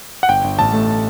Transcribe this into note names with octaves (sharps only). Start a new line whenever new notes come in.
F#5
G1 G5
G1
A1 A5
A3